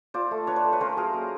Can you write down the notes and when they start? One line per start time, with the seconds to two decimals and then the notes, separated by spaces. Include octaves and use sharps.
0.14 F4 C5 D5
0.31 A3
0.47 D4 B4 C#5
0.56 C5 D5
0.64 A3
0.72 B4 C#5
0.80 C#4 A#4 C5
0.97 F#3 G#4 A#4
1.14 A#3